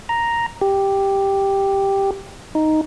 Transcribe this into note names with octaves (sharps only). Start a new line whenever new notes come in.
A#5
G4
D#4